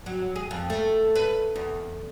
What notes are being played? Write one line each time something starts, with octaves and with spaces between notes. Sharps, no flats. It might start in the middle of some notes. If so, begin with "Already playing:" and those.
F#3
G#4
F2
A3
B4
E2